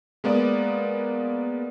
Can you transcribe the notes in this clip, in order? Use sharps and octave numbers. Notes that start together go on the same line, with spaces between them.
G#3 A#3 B3 D5